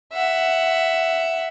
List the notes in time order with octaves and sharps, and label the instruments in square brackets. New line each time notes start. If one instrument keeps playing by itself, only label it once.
[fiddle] E5 F#5